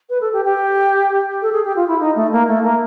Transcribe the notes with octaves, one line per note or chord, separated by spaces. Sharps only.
B4
A4
G4
G4
A4
G#4
G4
F4
E4
D#4
A3
A#3
A3
A#3